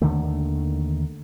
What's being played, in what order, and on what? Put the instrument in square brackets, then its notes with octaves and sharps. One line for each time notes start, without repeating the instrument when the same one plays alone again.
[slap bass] D#2 D3 D#3 A3